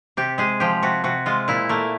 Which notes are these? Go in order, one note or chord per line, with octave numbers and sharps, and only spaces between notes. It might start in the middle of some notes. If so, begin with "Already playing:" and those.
C3 G4
G#3 G#4
F3 G4
C3 F#4
C3 F#4
G#3 F4
A#2 E4
A3 A#3